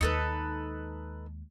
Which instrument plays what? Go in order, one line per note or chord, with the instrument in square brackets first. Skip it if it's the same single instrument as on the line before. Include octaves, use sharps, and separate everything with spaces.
[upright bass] D#2 G#3 [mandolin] D#4 A4 B4